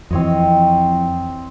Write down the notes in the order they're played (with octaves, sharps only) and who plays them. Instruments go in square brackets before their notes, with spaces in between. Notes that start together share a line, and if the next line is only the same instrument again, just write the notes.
[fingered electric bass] F2 E3 [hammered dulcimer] C4 C#5 D#5